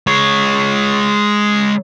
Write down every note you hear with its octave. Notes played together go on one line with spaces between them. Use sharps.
G#3 C#5